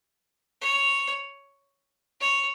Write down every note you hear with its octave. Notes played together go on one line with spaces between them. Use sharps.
C#5
C#5